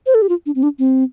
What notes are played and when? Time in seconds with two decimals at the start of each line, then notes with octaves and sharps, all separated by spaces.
0.06 C5
0.14 A4
0.22 G4
0.29 F4
0.46 D4
0.55 C4
0.63 D4
0.79 C4